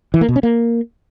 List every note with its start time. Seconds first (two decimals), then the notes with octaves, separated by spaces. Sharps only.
0.14 E3
0.21 A#3
0.28 B2
0.36 C#4
0.43 A#3